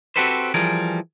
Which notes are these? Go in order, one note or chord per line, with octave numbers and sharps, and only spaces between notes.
C4 F#4 G4 A4 B4 C5
E3 F3 G3 G#4 A#4